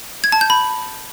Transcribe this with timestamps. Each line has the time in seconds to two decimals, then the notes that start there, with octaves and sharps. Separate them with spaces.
0.24 G#6
0.32 A5
0.41 G6
0.50 B5